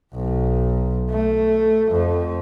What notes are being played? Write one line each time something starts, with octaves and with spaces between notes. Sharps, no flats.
B1
A3
F2